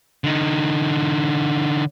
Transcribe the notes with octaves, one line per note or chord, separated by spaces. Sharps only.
D3 D#4